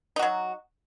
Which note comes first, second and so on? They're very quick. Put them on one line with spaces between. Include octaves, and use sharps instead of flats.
D#4 F#4 F#3